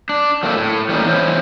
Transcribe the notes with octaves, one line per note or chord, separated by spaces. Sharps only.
D4
F#3 A3 A#3 C4 F#4 A4
A2
E3 G3 A3 A#3 C#4 D#4
E3 B3 E4 C5 C#5